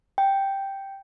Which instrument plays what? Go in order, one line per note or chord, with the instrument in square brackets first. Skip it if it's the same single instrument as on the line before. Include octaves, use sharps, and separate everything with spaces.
[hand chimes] G5